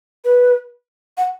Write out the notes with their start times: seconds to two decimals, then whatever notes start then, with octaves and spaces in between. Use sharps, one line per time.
0.25 B4
1.17 F#5